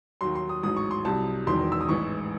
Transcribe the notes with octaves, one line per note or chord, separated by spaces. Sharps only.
D#2 D#3 F#3 C6
C6
D#6
A1 G#2 F#3 D#6
C#6
C6
C2 C3 F#3 A5
E1 E2 D#3 F#3 C6
E6
D#6
A1 G#2 E3 C#6